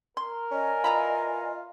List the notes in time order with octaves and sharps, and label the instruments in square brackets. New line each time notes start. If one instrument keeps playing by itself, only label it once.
[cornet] A#4 [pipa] C6
[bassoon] C#4 [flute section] D5 D#5 G#5
[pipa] E3 A#5 B5 [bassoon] F4